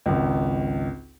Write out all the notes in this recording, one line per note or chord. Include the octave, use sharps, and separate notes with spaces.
G#1 C#2